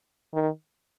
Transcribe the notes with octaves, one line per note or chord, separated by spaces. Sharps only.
D#3